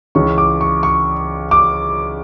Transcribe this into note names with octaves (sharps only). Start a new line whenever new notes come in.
C#2 C#3 E3 C#6
D6
C#6
C#6
D6